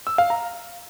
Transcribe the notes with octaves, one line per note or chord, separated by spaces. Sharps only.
E6
F5
A#5